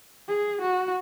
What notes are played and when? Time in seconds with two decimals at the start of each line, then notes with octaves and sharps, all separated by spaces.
0.28 G#4
0.61 F#4